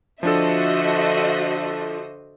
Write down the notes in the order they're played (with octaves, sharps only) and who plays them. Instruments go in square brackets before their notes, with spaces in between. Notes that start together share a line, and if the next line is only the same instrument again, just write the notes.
[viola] D3 C5 [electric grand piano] F3 D4 A4 [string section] F#4 D#5 E5